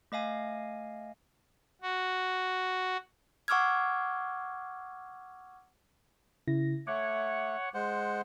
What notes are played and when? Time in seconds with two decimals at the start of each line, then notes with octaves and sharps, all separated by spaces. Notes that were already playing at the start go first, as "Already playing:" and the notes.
0.12 A3 D#5 F5 G#5
1.82 F#4
3.48 F#5 C#6 D6 E6 F6 G#6
6.48 C#3 E4 A#6
6.87 A3 C#5 F#5 D6 G#6
7.74 G#3 C5 F#5